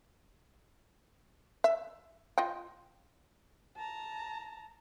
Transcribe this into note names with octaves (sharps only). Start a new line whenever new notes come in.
E5
F4 D#5 G5
A5 A#5